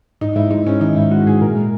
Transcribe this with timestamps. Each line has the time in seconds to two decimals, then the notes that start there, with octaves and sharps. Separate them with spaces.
0.21 G#2 D#4
0.36 G#2 E4
0.51 G#3 D#4
0.66 G#2 C#4
0.81 D#3 D#4
0.96 G#2 E4
1.11 G#3 F#4
1.26 G#2 G#4
1.41 A#2 A#4
1.56 G#3